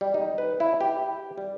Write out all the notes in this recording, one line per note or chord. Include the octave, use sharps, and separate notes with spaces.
G3
D#4
B4
E4
G4
G3